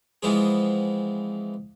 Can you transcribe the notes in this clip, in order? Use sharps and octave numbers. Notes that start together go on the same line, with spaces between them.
E3 F3 G#3 B3 C4 G#4